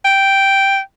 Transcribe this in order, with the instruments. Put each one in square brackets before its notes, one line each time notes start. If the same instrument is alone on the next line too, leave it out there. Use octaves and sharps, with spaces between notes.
[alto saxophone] G5